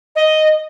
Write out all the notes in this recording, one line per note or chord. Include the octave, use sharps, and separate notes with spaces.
D#5